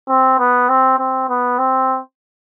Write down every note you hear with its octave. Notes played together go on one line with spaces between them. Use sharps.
C4
B3
C4
C4
B3
C4